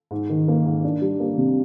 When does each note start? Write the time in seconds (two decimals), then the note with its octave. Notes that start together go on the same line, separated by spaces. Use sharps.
0.11 G#2
0.30 D#3
0.48 A#3
0.66 G#2
0.84 D4
1.02 G3
1.20 A#3
1.38 C3